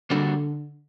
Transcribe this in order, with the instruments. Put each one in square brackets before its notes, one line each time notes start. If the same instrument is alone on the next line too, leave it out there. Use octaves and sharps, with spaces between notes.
[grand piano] D3 [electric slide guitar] G3 A#3 D4 F#4 A4